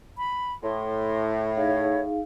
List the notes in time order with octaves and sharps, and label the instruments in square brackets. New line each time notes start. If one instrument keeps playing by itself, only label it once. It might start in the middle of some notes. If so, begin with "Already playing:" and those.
[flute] B5
[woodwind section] A2 [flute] C6
[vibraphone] D#4 G#4 F5 [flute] C#5